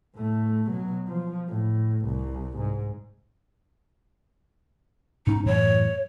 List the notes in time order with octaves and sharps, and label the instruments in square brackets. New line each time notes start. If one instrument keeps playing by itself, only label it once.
[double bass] A2 A3
B2 F#3
F3
A2
C2 C3
G#2
[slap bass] G#2 B2 C#4 [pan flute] D#4
[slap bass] F#2 A2 E3 [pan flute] C#5